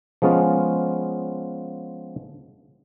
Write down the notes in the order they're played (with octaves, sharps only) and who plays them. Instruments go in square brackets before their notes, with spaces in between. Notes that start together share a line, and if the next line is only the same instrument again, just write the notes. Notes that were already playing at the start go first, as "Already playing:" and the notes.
[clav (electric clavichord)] F3 G#3 B3 C#4 F4